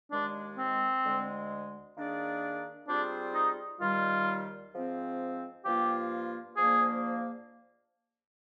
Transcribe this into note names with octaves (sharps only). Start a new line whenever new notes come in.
D#2 D#3 G#3 D4
C4
D2 D3 G#3
D#3 A#3 D4 G#4 D5
G3 C4 D4 F4 G#4 C5
D#4
D#2 D#3 G3 F4
G#2 F3 C4
G2 F3 A#3 F4 G4
G#2 F3 A#3 D4 G#4